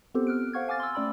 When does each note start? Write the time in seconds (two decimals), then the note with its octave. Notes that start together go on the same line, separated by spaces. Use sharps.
0.14 B3 C4 F4 G4 A4 C5
0.27 F6 F#6 D7
0.53 C5 F5 F#5 C#6 F6 G#6
0.68 F5 G#5 D6 F6 A6
0.80 C6 E6
0.94 A3 C#4 D5 G5 B5 E6